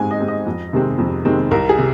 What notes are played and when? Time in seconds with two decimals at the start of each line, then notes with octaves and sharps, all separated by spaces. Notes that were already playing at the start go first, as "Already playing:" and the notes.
Already playing: G#2 G#3 C4 G#5
0.11 D#5
0.20 G#3 C4
0.28 D#5
0.47 F2
0.73 C3 D#3 G#3 C4
0.98 F2
1.25 C3 D#3 G#3 C4
1.51 C2 A#4
1.69 G#4
1.79 C3